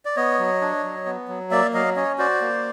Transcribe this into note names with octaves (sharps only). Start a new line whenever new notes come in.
D5
B3 C#5 D#5
F#3
D4
F#3
B3
F#3
A#3 D5 E5
F#3 D#5 F5
C#4 C#5 D#5
F#4 C5 D5
A#3